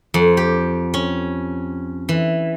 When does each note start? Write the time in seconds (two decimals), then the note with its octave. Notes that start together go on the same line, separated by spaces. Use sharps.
0.14 F2
0.37 G4
0.94 C#4
2.09 E3